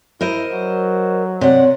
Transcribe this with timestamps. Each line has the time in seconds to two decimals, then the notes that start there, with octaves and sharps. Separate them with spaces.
0.21 E4 A#4 C5 D#5
0.51 F#3
1.41 C3 C#5 D5 F#5